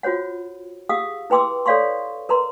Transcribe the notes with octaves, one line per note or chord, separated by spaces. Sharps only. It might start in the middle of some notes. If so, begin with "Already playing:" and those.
F4 F#4 C5 C#5 F#5
G4 G#4 F5 F#5 D#6 E6
E4 B4 G5 C6 D6 E6
A4 C#5 D5 F5 C6 C#6
A#4 B4 A#5 C6